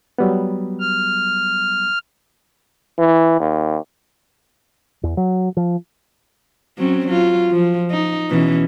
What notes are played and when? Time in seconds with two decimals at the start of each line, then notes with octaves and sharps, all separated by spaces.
0.18 F#3 G3 B3
0.80 F6
2.98 E3
3.40 D#2
5.03 E2
5.17 F#3
5.57 F3
6.78 F#3 C4 C#4
7.07 F#3 F4
7.51 F3
7.91 D#4
8.30 B2 E3 C#4